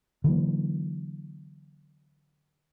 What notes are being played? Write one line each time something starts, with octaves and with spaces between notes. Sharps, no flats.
D3 E3 F#3 A#3